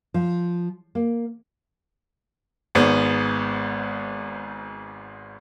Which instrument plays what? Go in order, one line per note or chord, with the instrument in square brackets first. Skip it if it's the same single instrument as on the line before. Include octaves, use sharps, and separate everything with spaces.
[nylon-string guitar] F3
A#3
[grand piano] G#1 G#2 B3